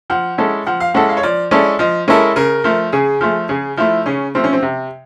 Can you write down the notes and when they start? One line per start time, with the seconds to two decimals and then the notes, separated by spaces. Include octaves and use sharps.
0.10 F3 F#5
0.38 G#3 C#4 E4 A4
0.67 F3 F#5
0.80 F5
0.94 G#3 C#4 E4 A4 F#5
1.09 F5
1.17 C#5
1.23 F3 D5
1.51 G#3 C#4 E4 A4 D5
1.79 F3 D#5
2.08 G#3 C#4 E4 A4 A#4
2.36 C#3 A#4
2.64 F3 A3
2.92 C#3 G#4
3.21 F3 A3
3.49 C#3 G#4
3.77 F3 A3 E4
4.06 C#3 C#4
4.35 F3 A3 C4
4.44 C#4
4.53 C4
4.63 C3